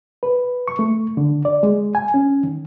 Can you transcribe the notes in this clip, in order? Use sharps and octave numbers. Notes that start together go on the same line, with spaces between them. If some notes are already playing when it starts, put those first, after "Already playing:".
B4
C#6
A3
D3
D5
G#3
G#5
C#4
D#3